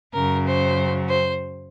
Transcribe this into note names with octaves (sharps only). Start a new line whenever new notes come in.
F#2 C#3 F#3 A#4
C5
C5